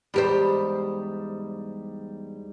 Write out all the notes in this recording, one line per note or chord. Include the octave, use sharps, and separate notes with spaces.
E2 G#2 G3 G4 C5